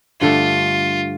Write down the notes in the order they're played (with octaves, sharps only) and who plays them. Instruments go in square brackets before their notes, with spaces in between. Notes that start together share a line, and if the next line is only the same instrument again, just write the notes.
[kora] G2 D3 A3 [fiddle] F4